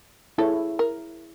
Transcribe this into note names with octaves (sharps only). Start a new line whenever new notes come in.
E4 G#4 A4 C#5
A#4